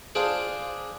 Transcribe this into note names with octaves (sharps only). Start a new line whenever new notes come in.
D4 F4 G#4 C5 D5